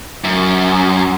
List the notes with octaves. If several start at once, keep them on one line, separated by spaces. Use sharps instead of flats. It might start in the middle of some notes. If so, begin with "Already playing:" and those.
F#2